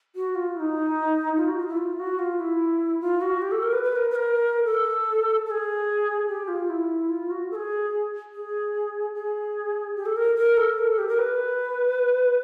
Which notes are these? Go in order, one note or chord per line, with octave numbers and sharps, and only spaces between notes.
F#4
F4
E4
D#4
F4
F#4
F4
E4
F4
F#4
F4
E4
F4
F#4
G4
A4
A#4
B4
B4
A#4
B4
A#4
A4
A4
G#4
G4
F4
E4
F4
F#4
A4
G#4
G#4
G#4
G4
A4
A#4
A#4
A4
A#4
A4
G4
A#4
B4